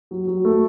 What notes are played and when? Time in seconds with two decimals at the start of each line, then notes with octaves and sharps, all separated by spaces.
0.11 F#3
0.27 F#3
0.45 A3